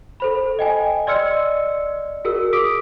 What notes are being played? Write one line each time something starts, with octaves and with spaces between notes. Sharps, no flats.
A4 C5 B5
D#5 G5 G#5
D5 D#5 C6 E6 F6 C#7
F#4 G#4 A#4 E6
D6 D#6 B6 D7